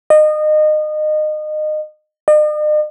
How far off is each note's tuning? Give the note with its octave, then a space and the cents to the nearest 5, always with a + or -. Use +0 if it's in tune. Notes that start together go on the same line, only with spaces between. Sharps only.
D#5 -25
D#5 -45